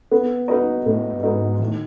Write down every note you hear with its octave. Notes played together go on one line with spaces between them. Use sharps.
B3
D#4 F#4 B4 D#5
A2 B3
G2
G#2 D#4 F#4 B4 D#5
A2 D#3